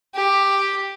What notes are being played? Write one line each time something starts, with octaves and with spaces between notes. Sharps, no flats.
G4